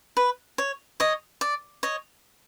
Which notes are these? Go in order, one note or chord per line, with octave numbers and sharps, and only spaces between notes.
B4
C#5
C#5 D#5
D5
C#5 D#5